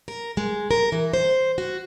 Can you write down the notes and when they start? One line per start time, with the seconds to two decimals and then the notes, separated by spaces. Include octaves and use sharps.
0.08 A#4
0.37 G#3
0.71 A#4
0.92 E3
1.13 C5
1.58 F#4